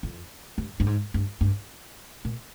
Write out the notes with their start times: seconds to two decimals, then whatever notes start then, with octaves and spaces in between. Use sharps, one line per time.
0.03 F2
0.58 G2
0.80 G2
0.86 G#2
1.14 G2
1.41 G2
2.25 A#2